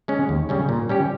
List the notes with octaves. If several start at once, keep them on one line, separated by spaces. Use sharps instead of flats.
G#3 C#4
D#2
C#3 G3 C#4
A#2
G3 C#4 G4